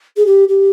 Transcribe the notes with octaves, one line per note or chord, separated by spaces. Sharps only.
G#4
G4
G4